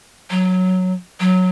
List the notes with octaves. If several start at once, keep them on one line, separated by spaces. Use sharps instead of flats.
F#3
F#3